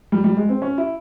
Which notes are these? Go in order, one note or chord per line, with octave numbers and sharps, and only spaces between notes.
G3
G3
G#3
C4
C#4
E4